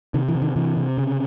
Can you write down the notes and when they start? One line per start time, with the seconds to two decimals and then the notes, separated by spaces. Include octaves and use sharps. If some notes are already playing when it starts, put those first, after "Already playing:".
0.14 C3 D#3
0.28 E3
0.35 C3
0.42 D#3
0.56 C3 E3
0.77 C3
0.98 C#3